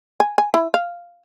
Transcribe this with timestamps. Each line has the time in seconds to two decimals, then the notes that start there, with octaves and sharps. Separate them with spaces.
0.20 G#5
0.38 G#5
0.54 E4
0.74 F5